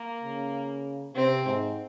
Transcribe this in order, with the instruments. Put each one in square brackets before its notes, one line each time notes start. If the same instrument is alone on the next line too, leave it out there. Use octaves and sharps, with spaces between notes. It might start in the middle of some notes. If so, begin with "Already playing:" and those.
Already playing: [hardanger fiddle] A#3
[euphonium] C#3
[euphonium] C3 [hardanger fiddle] C4
[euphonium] G#2